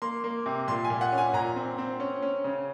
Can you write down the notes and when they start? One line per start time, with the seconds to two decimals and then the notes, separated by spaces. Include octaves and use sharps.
0.02 A#3 C6
0.24 A#3
0.46 C3
0.68 A#2 C6
0.84 G#5
0.90 A#2
1.01 F#5
1.12 C#4
1.18 G#5
1.34 A#2 A#5
1.56 C4
1.78 C4
2.00 C#4
2.22 C#4
2.44 C#3